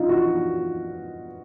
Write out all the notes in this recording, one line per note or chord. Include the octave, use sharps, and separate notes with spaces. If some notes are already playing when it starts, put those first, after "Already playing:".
Already playing: D4 D#4 F4
F#4